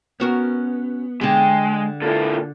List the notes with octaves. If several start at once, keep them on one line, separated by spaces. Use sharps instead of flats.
B3 C#4 F#4 A#4
D3 G#3 G4
A#2 E4 F4 A4